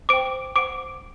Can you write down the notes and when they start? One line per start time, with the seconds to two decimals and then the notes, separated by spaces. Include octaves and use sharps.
0.09 C5 G5 D6 D7
0.56 C5 F#5 D6 D7